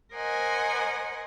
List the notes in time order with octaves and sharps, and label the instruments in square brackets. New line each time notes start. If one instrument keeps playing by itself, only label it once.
[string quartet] A#4 C5 D#5 F#5 G#5